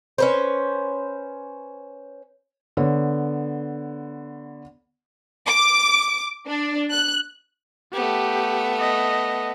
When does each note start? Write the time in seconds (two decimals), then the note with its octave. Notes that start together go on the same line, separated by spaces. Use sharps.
0.18 C#4 B4 C5
2.77 D3 B3 C#5
5.47 D6
6.47 D4
6.92 F#6
7.93 A3 B3 G4
8.79 D#5